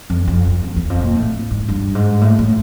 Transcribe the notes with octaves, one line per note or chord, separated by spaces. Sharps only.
F2
F2
F2
E2
F2
A#2
A2
G#2
G2
G#2
A2
A2